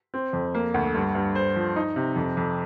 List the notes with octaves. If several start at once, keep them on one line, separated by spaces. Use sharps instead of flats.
C4
F2
A#3
D2
G2
G2
C5
F3
D#4
C3
F2
F2